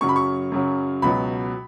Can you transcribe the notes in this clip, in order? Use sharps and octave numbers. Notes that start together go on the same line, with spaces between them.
F#2 C#3 F#3 C#6
B5
C#6
F#2 C#3 F#3
C#2 B2 F#3 B5